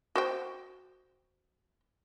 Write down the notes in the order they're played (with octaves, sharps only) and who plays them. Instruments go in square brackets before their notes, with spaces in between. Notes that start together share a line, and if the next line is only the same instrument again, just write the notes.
[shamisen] F#4 C5 G5